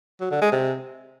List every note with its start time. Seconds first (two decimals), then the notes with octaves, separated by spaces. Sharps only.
0.21 F#3
0.31 D3
0.42 G#3
0.52 C3